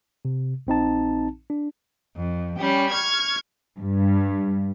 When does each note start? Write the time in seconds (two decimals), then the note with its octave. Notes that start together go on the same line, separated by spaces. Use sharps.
0.25 C3
0.67 A#1 C4 D#4 A5
1.50 D4
2.16 F2
2.57 G3 C#4 G4
2.90 C#6 F6 G#6
3.79 G2